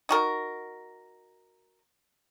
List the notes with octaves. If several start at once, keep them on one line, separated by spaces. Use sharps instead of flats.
D#4 F#4 A#4